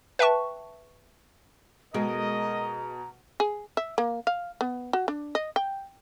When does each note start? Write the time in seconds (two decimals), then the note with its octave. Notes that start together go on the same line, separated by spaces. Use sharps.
0.19 B4 E5 G5 A5 C#6
1.94 B2 G#3 A#4 D#5 A#5 D7
3.40 G#4
3.77 E5
3.98 A#3
4.27 F5
4.61 B3
4.93 F#4
5.08 D4
5.35 D#5
5.56 G5